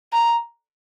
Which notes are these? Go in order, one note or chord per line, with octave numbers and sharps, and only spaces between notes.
A#5